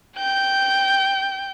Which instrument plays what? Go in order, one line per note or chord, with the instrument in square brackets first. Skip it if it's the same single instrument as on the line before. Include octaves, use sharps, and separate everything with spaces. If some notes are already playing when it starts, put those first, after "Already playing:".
[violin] G5 G6